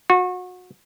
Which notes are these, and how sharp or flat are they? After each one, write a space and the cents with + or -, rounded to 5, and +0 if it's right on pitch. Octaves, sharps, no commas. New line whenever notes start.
F#4 -30